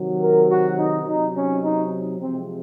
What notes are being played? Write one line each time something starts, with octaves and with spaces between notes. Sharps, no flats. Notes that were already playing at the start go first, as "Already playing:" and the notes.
Already playing: C3 D#3 F#3
A#4
F#4
D#4
C3 F#3 D#4
C#4
D#4
C3 F3 G#3 C4